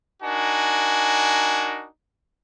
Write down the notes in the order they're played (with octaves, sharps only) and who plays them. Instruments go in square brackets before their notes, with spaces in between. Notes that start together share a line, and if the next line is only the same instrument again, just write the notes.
[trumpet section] D4 D#4 F#4 A#4 G#5